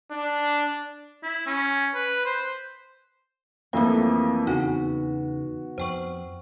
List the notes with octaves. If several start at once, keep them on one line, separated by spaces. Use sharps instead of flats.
D4
E4
C#4
B4
C5
F2 E3 G3 A3 A#3 C4 F5
E2 C#3 B3 D#4 F#4
F2 C5 G5 C#6